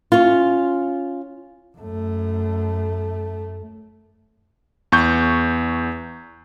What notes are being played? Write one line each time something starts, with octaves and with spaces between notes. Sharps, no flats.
C#4 F4
F#2 A3
E2 C#6 G6